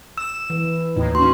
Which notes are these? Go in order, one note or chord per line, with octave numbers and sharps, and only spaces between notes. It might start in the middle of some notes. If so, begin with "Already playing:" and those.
E6 E7
E3
D#2 A2 D#4
C#4 F#4 C6